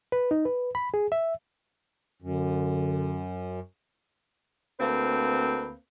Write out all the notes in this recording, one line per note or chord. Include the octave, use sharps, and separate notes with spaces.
B4
D#4
B4
B5
G#4
E5
F#2 D3
D2 A#3 C4 B4